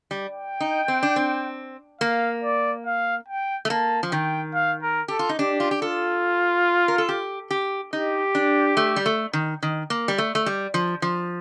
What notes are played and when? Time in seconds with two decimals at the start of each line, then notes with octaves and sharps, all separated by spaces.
0.11 G3
0.32 G5
0.60 D#4
0.88 C4
1.03 D4
1.16 C4
2.01 A#3 F5
2.43 D5
2.86 F5
3.28 G5
3.65 A3
3.70 A#3 A5
4.03 F3
4.12 D#3 G5
4.54 F5
4.83 A#4
5.08 G4 A4
5.19 F4
5.29 D#4
5.39 D4 G4
5.60 F4
5.71 G4
5.81 F4 A4
6.88 A#4
6.98 A4
7.09 G4
7.51 G4
7.93 D#4 G4
8.35 D4
8.77 A3
8.96 G3
9.06 A3
9.33 D#3
9.63 D#3
9.90 A#3
10.08 G3
10.18 A3
10.35 A3
10.46 G3
10.74 F3
11.02 F3